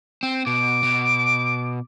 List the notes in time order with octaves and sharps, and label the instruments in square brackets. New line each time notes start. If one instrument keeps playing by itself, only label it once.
[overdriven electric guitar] C4
[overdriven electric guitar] B2 [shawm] D6
[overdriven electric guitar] B2